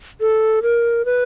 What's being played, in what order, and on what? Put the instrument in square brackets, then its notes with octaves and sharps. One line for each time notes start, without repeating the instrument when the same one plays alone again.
[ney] A4
A#4
B4